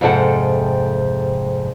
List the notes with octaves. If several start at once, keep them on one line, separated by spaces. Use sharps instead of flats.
F2 G#2 C3 A4 F#5